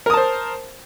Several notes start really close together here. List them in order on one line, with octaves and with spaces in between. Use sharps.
A#4 D#6 A5 C5